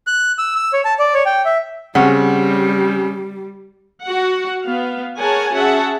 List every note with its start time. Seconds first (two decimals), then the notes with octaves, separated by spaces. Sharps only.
0.07 F#6
0.38 E6
0.56 E6
0.73 C#5
0.85 A5
1.00 D5
1.14 C#5
1.26 G5
1.45 E5
1.95 C#3 G3 C4 C#4 F#5
4.02 F#4 F#5
4.64 B3 F5
5.18 G#4 A#4 C#5 F#5 G#5 A5
5.53 C#4 F#4 G#4 E5 F#5 A5